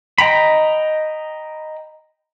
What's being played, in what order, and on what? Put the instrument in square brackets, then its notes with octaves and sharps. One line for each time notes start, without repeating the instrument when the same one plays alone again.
[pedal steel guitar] D#5 G5 A#5 B5